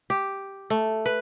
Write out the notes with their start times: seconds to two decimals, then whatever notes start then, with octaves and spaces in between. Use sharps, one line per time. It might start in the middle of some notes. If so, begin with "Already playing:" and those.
0.10 G4
0.70 A3
1.06 B4